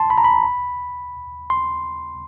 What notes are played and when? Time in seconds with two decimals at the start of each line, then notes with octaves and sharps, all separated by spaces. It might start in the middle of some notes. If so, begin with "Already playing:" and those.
Already playing: A5 C6
0.10 B5
0.18 A#5
0.24 B5
1.50 C6